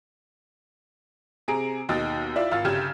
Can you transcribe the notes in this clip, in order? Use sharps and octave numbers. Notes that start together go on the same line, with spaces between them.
C3 G#4 A#5 D7
D#2 B2 D#4 E6 A6
E4 F4 D5 E5
G#1 F4 F5 E6 A6
G1 C#3 G4 F6 G#6 E7